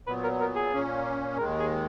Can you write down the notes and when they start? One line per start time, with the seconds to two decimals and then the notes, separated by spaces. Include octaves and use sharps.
0.06 A#2 F#3 B3 B4
0.23 A#4
0.40 A#4
0.56 G#4
0.72 A#2 A#3 C#4
1.38 D#2 D#3 G#3 A#4
1.60 G#4